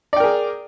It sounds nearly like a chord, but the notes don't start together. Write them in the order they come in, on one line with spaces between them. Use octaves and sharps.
D5 G5 A#4 G#4